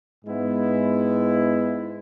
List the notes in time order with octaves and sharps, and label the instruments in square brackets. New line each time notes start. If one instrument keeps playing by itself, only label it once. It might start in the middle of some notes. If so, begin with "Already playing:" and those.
[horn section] G#2 G#3 B3 E4